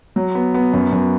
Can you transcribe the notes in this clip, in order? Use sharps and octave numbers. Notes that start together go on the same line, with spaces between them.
F#3
B3
B3
F#2
F#2